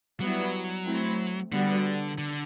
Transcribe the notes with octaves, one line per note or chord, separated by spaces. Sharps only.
F#3 G3 B3 E4
A3 C4 E4
D3 G3 B3 F#4
D3